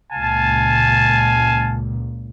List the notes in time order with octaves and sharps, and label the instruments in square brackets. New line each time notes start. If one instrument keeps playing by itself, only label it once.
[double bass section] C#2 A#2 [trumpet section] F5 G#5 A5